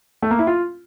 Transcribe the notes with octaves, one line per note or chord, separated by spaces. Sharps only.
A3
A#3
E4
F4